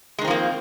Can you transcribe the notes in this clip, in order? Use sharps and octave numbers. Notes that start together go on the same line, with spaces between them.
D#3 F3 G#3 A#3 C4